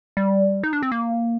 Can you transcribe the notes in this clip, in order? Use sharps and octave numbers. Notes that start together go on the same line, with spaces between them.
G3
D#4
D4
C4
A#3